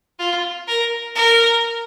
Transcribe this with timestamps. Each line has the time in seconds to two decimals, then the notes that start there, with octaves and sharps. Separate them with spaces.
0.19 F4
0.68 A#4
1.16 A#4